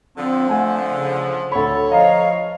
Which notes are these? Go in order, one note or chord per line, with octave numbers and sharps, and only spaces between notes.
D3 F3 C4
A3 F#5 G#5 A5
C#3
D2 A4 C#5 B5
F3 D#5 F5 A#5